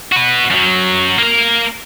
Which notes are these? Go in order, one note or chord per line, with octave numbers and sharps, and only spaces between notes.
F#4 B4
F#2 F#3
A#3 A#4